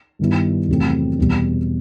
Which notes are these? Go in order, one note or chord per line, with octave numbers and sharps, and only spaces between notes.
G2 D#3 G3 B3 E4
E2 C3 F#3 A3 C4
E2 B2 G3 B3